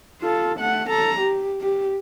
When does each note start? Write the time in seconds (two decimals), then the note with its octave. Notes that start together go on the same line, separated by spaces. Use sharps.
0.22 F4 A4
0.59 A3 F#5
0.89 A4 A#5
1.19 G4
1.61 G4